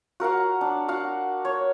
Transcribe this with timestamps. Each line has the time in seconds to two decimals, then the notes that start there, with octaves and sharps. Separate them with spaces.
0.20 F#4 A#4 F5 F#5
0.61 D4
0.88 F#4 F5 F#5
1.45 C#5